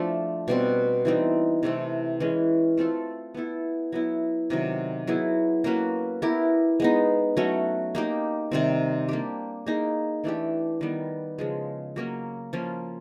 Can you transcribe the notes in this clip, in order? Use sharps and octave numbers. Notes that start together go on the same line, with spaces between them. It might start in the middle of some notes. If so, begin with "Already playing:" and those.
Already playing: F3 A3 D4
B2 G3 C4
E3 G3 C4 D#4
C3 E3 A3 C4
E3 G#3 C#4
A3 C4 F4 A4
B3 E4 A4
F#3 B3 E4
C3 D#3 F#3
F#3 B3 E4 G#4
A#3 C#4 F#4 B4
B3 E4 G4 A#4
G#3 B3 D#4
F#3 A3 C#4 F#4
A#3 D#4 G4
C3 D#3 G3 C4
A#3 D4 G4
A#3 D#4 G#4
E3 A3 D4 G4
D#3 G3 B3
C#3 F3 G#3
F#3 A#3 C#4
F3 A#3 C#4 F4